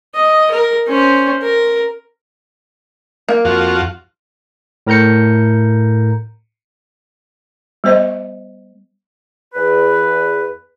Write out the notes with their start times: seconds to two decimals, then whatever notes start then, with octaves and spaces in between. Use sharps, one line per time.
0.14 D#5
0.51 A#4
0.88 C#4 C5
1.42 A#4
3.29 A#3
3.45 F2 F4 F#4
4.87 A2 A#4 A#5 G6 C#7
7.84 G3 B3 C5 D#5
9.54 E2 B4